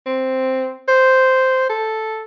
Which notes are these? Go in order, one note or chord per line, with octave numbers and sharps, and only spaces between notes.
C4
C5
A4